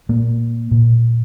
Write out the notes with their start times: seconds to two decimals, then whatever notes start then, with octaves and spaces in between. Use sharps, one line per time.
0.09 A#2 A#3
0.71 A#2